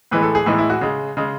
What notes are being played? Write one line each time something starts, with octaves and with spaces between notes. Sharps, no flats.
A2 E3 G#3 B4
A4
G#4
A2 E3 G#3 D#4
E4
F#4
C#3 G#3
C#3 G#3